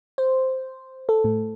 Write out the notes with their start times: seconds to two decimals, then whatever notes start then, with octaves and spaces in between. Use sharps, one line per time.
0.18 C5
1.09 A4
1.24 A2